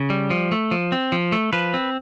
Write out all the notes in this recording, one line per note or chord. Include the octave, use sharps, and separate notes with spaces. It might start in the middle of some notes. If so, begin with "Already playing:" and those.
Already playing: C#3
G3
F3
A3
F3
C4
F3
A3
F3 B4
C4